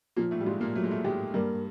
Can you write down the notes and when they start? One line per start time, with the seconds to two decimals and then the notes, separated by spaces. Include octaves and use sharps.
0.16 A#2 F3 A#3
0.31 A2 A3
0.40 G3
0.46 G#2 G#3 F4
0.61 A#2 A#3
0.76 F#3 A3
0.84 G#3
0.91 A2 A3
1.04 G#2 G#3 G4
1.34 G2 G3 A#3